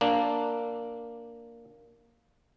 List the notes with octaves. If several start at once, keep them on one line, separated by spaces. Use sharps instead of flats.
A#3 D4